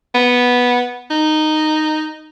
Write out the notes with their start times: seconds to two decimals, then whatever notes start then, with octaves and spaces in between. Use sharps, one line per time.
0.15 B3
1.11 D#4